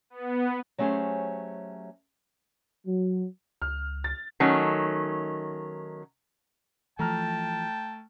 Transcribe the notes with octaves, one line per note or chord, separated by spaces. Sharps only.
B3
F#3 A3 C#4 G4 G#4 C5
F#3
C#2 F6
A6
D#3 F#3 A3 C#4
E3 F3 A3 G5 A5 A#5 F6